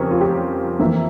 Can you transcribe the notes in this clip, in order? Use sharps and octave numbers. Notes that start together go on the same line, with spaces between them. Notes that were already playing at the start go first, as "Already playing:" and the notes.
Already playing: F2 C#3 G3 C#4 A#4 C#5
F4
G4
F2 E3 A#3 E4